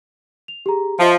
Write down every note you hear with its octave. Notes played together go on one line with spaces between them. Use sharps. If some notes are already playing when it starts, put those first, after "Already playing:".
F7
G4 G#4 A#5
F3 D#5 E5 A5